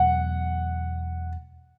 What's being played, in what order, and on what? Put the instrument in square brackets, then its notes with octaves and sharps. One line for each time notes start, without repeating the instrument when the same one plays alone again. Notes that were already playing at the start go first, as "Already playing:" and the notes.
Already playing: [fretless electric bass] E2 B2 F#3 A3 [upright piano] F#5